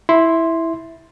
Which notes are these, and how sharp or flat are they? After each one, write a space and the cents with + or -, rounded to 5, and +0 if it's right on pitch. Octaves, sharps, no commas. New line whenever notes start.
E4 -5 C6 +0